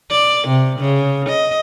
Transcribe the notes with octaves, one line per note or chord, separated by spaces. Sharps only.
D5
C3
C#3
D#5